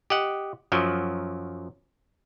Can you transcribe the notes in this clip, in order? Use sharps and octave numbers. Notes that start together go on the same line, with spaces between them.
G4 D#5 F#5
F#2 F3 F#3